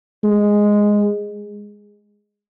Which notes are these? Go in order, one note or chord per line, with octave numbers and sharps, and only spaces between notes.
G#3